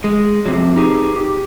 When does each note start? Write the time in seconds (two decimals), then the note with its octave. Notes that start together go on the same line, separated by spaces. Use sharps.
0.04 G#3
0.46 F2 C3 F#3
0.76 D#4 G4 G#4
1.16 G4